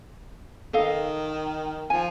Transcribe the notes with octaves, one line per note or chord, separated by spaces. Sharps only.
D#3 A4 D#5 F5
F3 G#5